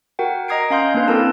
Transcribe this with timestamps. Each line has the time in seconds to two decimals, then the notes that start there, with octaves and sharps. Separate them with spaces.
0.19 F#4 A#4 F#5 G5
0.48 D#5 A#5 D#6 G#6 C7 D7
0.70 C#4 F5 C6 G6
0.94 A#3 D4 B4
1.08 C4 E4 A4 A#4 A5